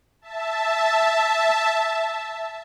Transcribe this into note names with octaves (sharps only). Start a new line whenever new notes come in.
E5 A5